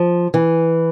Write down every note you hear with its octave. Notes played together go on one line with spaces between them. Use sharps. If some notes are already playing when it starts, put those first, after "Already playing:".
Already playing: F3
E3